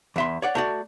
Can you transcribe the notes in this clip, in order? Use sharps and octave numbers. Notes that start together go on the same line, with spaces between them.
E2 E5 C6
C#5 D5 F#5
A3 F#4 D5